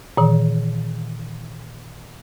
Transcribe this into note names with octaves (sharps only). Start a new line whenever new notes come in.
A#2 D#3 E3